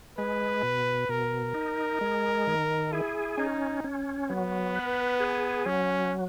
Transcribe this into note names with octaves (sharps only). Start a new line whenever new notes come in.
G#3 B4
B2
B2 A#4
D#4
G#3
D#3
E4 G#4
C#4 D#4
C#4
F#3 B3
B4
G#4
F#3 C#4